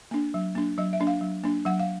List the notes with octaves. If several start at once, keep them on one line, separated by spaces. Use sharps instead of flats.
A#3 D4
F#3
A#3 D4
F#3 D#5
E5
A#3 D4
F5
F#3
A#3 D4
F#3 F#5
F5